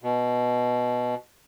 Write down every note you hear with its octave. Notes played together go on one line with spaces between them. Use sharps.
B2